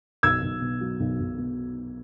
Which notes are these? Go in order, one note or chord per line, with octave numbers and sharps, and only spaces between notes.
B1 E6 G#6
B1
B2
F#3
B1
B1
B2